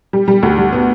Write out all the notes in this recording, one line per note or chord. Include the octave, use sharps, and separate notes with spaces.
G3
G3
D2
G3
B3